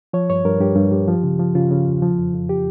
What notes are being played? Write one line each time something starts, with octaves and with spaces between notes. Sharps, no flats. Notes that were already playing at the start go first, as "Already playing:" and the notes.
F3 C#5
G2 C#5
G2 A#4
G2 G4
G2
G2
F3
C#3
F3
C#3 F4
C#3
E2
F3
F2
F2
G4